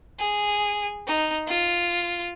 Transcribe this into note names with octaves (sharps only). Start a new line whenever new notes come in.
G#4
D#4
F4